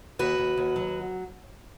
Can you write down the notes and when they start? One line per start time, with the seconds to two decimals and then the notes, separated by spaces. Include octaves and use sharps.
0.19 D#2 F#4 B4
0.38 D#2
0.57 D#2
0.76 F#3